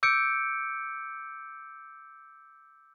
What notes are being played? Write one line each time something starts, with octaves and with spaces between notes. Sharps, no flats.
D6 E6 G6 C#7 D7